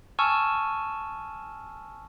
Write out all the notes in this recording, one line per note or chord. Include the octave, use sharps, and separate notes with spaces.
G#5 A5 C#6 E6 F6